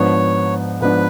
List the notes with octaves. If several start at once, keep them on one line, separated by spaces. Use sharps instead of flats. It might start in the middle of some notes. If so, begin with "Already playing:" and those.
Already playing: G#2 F3 B3 D4 C#5
G#2 F3 B3 D4 B4